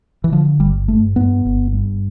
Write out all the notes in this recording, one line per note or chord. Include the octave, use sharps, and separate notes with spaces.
E3
D3 F3
G1 G3
G2 A3
G2 B3
G1
G2